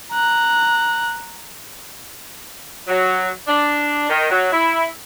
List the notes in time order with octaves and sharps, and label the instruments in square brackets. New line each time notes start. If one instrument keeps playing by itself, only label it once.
[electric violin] A#5 F#6
[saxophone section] F#3
D4
D#3
F#3
E4